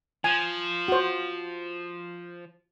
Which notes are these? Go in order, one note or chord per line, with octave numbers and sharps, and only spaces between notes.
F3 G#5
F#4 C5